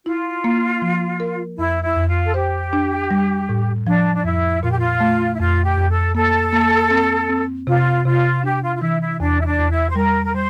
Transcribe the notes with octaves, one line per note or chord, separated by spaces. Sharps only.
E4 F4
A#3
F3
A#4
F2 E4
E4
F2
F4
A4
G4 C5
D4
G3
A2
F3 D4
D4
F2 E4
A#2 F4
G4
F4
A3
E4
F2 F4
G4
F2
A4
A#3 A4
A#3
C4
C4
C3 F4
C3 F4
D4 G4
F4
F4
E3 E4
E4
E2 D4
E4
D4
E2
E4
C5
G3 A#4
A#4
G3 C5